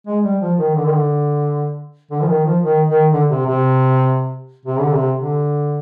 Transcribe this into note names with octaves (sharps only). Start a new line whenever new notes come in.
G#3
G3
F3
D#3
D3
D#3
D3
D3
F3
D#3
F3
D#3
D#3
D3
C3
C3
C3
D3
C3
D3